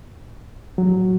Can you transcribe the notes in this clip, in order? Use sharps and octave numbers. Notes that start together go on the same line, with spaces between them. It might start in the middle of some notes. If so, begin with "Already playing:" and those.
F#3